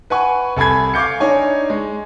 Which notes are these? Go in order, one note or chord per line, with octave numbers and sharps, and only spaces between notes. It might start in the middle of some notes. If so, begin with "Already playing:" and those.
B4 F#5 G#5 C#6
C2 A4 G#5 B5 G#6
F5 C#6 D6 G6 C#7
D4 D#4 C#5 G#5
G#3